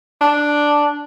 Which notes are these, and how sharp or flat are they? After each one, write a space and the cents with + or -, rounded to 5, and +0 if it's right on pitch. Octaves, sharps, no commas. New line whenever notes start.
D4 +0